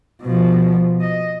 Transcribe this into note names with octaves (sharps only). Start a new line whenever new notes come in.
B2 F3
D#5